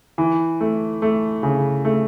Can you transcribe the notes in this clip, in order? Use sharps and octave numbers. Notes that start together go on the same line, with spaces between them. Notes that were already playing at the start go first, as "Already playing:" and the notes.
E3
A3
A3
C#3
A3